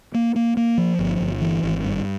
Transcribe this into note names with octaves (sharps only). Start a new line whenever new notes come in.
A#3
A#3
A#3
F3
G1
G1
E3
G#1
G2